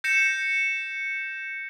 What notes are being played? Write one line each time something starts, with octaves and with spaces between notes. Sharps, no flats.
G6 A#6 C#7 E7